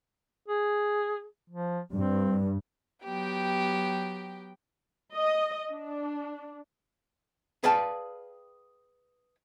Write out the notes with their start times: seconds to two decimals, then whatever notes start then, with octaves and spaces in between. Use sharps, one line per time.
0.48 G#4
1.50 F3
1.94 G2 C4
3.03 F#3 B3 G4 G5
5.14 D#5
5.71 D4
7.64 G#4 B4 D5 F5 G5 A5